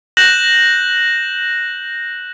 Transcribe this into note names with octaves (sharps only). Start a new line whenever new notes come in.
F#6 G6 A#6 E7 F#7